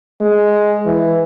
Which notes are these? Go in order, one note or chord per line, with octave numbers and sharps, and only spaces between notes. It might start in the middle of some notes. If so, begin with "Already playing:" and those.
G#3
E3